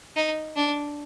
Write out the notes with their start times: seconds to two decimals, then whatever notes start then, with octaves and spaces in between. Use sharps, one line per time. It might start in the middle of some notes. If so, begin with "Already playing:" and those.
0.16 D#4
0.56 D4